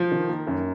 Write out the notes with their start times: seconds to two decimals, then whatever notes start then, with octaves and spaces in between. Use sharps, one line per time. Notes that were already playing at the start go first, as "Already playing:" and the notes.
Already playing: F3
0.11 D#3
0.29 A#3
0.47 F#2